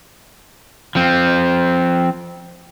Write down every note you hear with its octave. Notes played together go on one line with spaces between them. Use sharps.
F3 C4